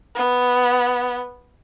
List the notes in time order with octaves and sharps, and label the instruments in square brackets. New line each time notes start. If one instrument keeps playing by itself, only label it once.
[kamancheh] B3